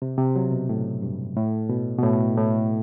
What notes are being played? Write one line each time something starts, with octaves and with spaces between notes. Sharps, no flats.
C3
C3
F#3
B2
A2
G2
A2
B2
B2
A2
A2